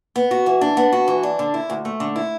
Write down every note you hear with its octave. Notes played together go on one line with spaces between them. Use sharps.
B3
F#4
E3
D4
B3
F#4
E3
D4
D3
E4
D2
A3
D3
E4